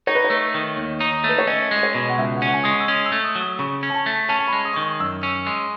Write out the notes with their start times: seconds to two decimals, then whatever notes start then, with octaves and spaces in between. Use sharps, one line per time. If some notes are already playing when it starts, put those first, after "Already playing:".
0.07 D#4 C#5
0.15 B4
0.25 C#5
0.30 A3
0.54 D#3
0.77 D#2
1.00 D#4
1.24 A3
1.29 B4
1.38 C#5
1.47 C#4 D#5
1.71 G#3 D#5
1.83 C#5
1.94 B2
2.09 F#5
2.18 C#2 E5
2.36 F#5
2.42 C#4
2.47 F#5
2.53 G#5
2.63 G#3 D#6
2.71 C#6
2.80 E6
2.88 C#4 D#6
3.06 E6
3.12 A3
3.24 D#6
3.36 F#3
3.41 D#6
3.59 C#3 C#6
3.83 C#4
3.90 G#5
3.94 A5
4.06 A3
4.29 C#4 A5
4.39 A5
4.48 B5
4.53 G#3
4.65 D#6
4.73 D#3 C#6
4.82 D#6
5.00 F#2 E6
5.23 C#4
5.47 G#3